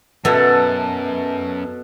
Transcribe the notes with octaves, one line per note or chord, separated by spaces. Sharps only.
F#2 B2 B3 E4 A4 A5 A#5